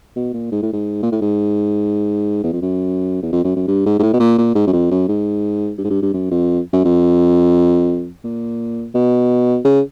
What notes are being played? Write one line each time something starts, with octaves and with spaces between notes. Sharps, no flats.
B2
A#2
G#2
A2
G#2
A#2
A2
G#2
E2
F2
F#2
E2
F2
F#2
F#2
G2
G#2
G#2
A2
B2
A#2
A#2
G#2
F#2
F2
F#2
G#2
G2
G#2
G2
G2
F#2
F2
F#2
F2
A#2
B2
C#3